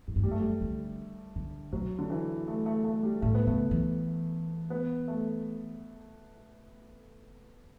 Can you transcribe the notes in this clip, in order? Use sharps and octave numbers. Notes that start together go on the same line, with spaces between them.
A2
G2
F#2 G3
A3
G3
D3
D3
B2 F#3
D3
E3
A3
A3
A3
G3
A2 A3
B3
C#3 A3
E3
B3
A3